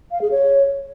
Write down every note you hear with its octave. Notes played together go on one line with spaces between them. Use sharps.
F5
G#4
C#5